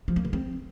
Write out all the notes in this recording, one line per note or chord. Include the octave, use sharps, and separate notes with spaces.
F3
A#3
D3
C4